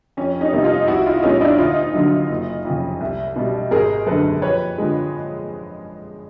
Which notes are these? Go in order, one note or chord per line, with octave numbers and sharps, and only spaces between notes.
F2 C#4
C#4 D#4
C3 D#3 G3 B3
D#4 F4
C2 E4 F#4
D#4 F4
E4
A#2 F3 G#3 B3 C#4 D#4
D4 E4
D2 D#4 F4
D3 F#3
F#1
F2 C#3
C2
B2 G3
G#1 G#4 A#4
F#2 D3 A4 B4
F2 B4 C#5
D3 F3 G#3